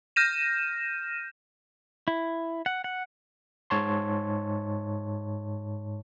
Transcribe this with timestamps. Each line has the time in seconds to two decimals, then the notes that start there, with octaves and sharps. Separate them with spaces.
0.16 F6 G6 A#6 D#7 E7
2.08 E4
2.66 F#5
2.84 F#5
3.70 G#2 C#5 A5 C6